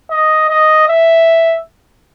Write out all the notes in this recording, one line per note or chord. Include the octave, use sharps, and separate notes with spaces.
D#5
D#5
E5